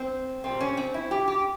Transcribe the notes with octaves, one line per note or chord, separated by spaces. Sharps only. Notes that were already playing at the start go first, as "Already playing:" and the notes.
Already playing: C4
A#2 G3 C4
C#4
C4
E4
G4
G4